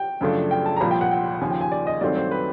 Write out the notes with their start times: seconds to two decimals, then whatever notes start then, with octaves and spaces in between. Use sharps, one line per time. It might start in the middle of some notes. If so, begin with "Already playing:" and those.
Already playing: G5
0.21 F#2 C#3 F3 A3 D4
0.51 G5
0.66 A5
0.77 A#5
0.81 C2 A#2 F3 B5
0.91 G5
1.01 F#5
1.11 G5
1.41 D#2 C#3 F3 G#5
1.50 G5
1.61 G#5
1.72 D5
1.87 D#5
2.01 G2 D#3 F#3 A3 C4 D5
2.16 C5
2.31 B4